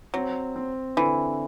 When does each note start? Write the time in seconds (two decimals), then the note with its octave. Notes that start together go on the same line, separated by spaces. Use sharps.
0.14 F#3 C4
0.56 C4
0.97 D3 E3